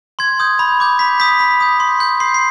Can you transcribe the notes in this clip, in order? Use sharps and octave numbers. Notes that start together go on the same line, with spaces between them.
C6 G#6
D#6 G6
B5
D6 G6
B5 B6
D#6 G6 B6
B5
D#6 G6
C6
G6
C6 C7
C7